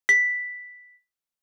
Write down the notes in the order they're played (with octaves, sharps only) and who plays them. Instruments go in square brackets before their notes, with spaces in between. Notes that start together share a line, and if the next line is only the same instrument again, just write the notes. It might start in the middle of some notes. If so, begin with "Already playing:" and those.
[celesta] B6